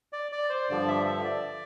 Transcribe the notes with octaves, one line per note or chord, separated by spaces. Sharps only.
D5
D5
C5
G2 D3 F3 D5
E5
E5
D5